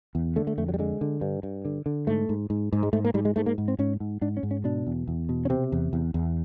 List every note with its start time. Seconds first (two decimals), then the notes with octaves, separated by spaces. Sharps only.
0.15 E2
0.36 D3 A3
0.47 A3
0.58 F2 A3
0.68 F#3
0.74 G3
0.79 D3 G#3
1.01 D3
1.21 G2
1.43 G2
1.65 D3
1.86 D3
2.07 G#2 A3
2.29 G#2
2.50 G#2
2.73 G#2
2.83 G#3
2.93 G#2 A3
3.05 A#3
3.14 G#2 G3
3.25 G#3
3.36 G#2 A3
3.46 A#3
3.58 G#2
3.68 C4
3.79 G#2 C#4
4.00 G#2
4.21 G#2 D4
4.37 C#4
4.43 G#2
4.51 C#4
4.64 B2 D4
4.87 E2
5.08 E2
5.29 B2
5.45 C#4
5.50 C3 C4
5.72 E2
5.93 E2
6.14 E2